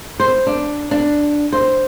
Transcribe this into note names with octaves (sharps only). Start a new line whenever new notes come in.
C5
D4
D4
C5